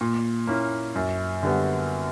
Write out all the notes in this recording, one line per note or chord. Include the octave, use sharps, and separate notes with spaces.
A#2
A#3 C#4 E4
F#2
D3 G3 B3